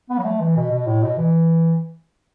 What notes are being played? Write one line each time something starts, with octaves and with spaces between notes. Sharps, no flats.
B3
F#3
A3
E3
B2
B2
A2
B2
E3